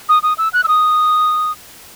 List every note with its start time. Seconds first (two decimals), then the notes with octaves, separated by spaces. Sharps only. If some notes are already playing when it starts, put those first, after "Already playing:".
0.09 D#6
0.23 D#6
0.38 E6
0.53 F#6
0.64 E6
0.68 D#6